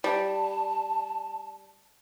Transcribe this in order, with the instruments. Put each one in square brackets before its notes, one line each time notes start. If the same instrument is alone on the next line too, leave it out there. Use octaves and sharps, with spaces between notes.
[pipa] G3 [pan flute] A5